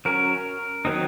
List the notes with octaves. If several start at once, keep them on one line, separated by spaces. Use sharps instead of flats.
F#3 C#4 A#4
D#3 F#3 C4 D#4